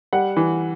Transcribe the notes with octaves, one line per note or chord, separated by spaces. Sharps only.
G3 F#5
E3